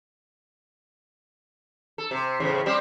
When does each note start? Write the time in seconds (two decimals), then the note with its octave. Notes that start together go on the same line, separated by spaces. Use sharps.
1.98 A4
2.11 C3
2.40 E2 A2 C#3
2.66 G3 C4 G4